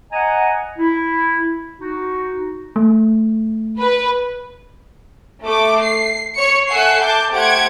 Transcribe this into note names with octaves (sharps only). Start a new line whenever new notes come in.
D#5 F#5 G#5 A#5
E4
D#4 F#4
A3
B4
A3 D6
C7
C#5 C#7
A4 E5 F#5 G#5 F#6 C7
A5 D6 G6
A3 G4 C5 F#5 G#6 D7